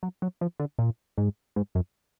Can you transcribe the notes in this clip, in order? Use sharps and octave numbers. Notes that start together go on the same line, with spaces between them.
F#3
F#3
F3
D3
A#2
G#2
G#2
F#2